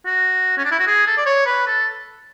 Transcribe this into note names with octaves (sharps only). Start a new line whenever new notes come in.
F#4
C#4
D4
E4
F#4
G#4
A4
D5
C#5
B4
A4